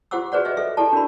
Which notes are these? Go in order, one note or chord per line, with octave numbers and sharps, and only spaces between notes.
F4 G4 C5 F#5 D6 E6
F#4 G#4 B4 C5 D5 F#5
G#4 B4 C5 D#5 E5
A4 B4 E5
E4 G4 A4 D5 A5
D4 F#4 A#4 B5